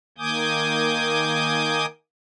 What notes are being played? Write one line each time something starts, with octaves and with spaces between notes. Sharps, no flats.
D#3 A#3 G#5 D6 D#6 G6